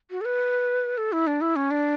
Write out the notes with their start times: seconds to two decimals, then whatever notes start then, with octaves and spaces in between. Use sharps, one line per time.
0.11 F#4
0.21 A4
0.25 B4
0.98 A4
1.12 E4
1.27 D4
1.41 E4
1.56 C#4
1.71 D4